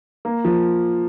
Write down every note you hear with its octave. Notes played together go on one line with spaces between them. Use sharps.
A#3
F3